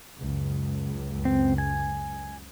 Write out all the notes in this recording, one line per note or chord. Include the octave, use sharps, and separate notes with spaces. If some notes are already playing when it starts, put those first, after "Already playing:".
C#2 F#2 C#3
C4
G#5